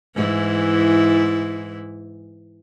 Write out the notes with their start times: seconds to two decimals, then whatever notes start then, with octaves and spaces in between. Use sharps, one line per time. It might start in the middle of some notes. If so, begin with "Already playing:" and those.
0.15 G#2 E3 E4